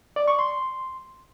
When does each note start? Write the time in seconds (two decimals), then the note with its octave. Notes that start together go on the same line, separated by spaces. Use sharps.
0.16 D5
0.28 C#6
0.39 C6